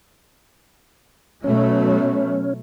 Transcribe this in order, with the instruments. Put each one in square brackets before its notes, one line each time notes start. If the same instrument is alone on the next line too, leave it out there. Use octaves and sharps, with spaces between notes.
[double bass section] B2 F#3 A3 [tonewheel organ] C#4